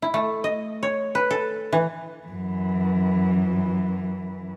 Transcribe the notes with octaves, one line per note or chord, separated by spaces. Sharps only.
E4
A3
D#5
C#5
B4
A4
E3
F#2 E3